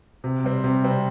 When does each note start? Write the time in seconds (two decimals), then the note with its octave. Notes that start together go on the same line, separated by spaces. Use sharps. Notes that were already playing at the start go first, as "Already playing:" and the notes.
0.24 C3
0.44 G3 C4
0.64 C3
0.84 G3 C4